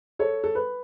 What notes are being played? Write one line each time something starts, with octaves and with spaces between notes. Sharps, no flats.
A4 C#5
A4
B4